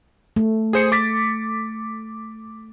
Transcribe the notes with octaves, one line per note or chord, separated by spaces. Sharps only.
A3
G#4 C5 C#7
D6 A6 B6